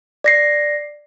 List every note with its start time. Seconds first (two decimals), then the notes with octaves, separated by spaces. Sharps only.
0.24 D5 A#6 C7